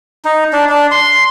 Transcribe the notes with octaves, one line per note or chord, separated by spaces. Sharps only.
D#4
D4
D4
C6